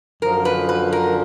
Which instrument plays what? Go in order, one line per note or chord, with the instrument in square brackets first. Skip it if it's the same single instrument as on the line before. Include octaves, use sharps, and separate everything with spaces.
[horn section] F#2 D3 F3 [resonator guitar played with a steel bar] A#4
[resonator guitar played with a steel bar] B4
B4
A#4